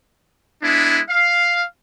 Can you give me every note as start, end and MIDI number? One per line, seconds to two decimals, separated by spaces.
0.62 1.00 56
0.62 1.00 59
0.62 1.00 62
0.62 1.00 64
1.09 1.64 77